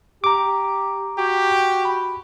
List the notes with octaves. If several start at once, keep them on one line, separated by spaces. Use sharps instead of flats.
G4 A#5 D6
F#4 G4
B5